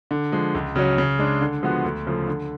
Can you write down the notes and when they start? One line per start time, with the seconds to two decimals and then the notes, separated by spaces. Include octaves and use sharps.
0.11 D3
0.32 F3 G#3
0.55 C#2
0.76 C#3 F#3 C#4
0.98 C#3
1.19 G#3 D4
1.41 D3
1.63 F3 G#3 B3 F#4
1.84 D2
2.07 C#3 F3 A3
2.28 D3